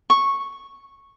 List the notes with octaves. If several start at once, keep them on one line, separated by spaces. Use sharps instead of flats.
C#6